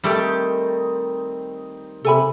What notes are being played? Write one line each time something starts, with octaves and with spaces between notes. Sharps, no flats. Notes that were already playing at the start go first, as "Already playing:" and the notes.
D#3 G3 A3 C4 D#4 G4
C3 A4 G#5 B5